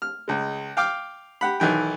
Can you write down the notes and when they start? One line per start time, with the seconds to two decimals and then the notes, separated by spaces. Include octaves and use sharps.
0.02 F6
0.28 C#2 G#3
0.77 F5 G5 D6 F6
1.41 G4 F#5 B5
1.60 B1 D#3 E3 G5